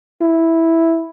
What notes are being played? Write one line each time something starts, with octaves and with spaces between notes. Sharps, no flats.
E4